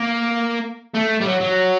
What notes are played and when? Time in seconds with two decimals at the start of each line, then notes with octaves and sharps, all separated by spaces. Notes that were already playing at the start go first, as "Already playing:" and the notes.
Already playing: A#3
0.95 A3
1.21 G3
1.25 F#3
1.41 F#3